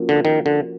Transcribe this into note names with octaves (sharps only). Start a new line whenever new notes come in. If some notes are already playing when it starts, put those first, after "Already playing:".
Already playing: F3 A#3 C#4 F#4
D3
D#3
D3